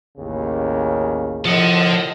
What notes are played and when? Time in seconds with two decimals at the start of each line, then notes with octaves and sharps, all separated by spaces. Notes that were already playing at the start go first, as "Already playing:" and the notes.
0.17 A1 D#2 C#3
1.45 C2 A2 F3 A4 D#5 F#5